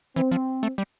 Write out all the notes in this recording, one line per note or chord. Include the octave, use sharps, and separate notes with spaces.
E3 C4
F3
A3
G3